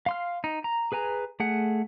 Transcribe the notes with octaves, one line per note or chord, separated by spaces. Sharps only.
F5 C6 F6
D#4
A#5
G#4 B4 G#5 A#5
A3 G#4 F#5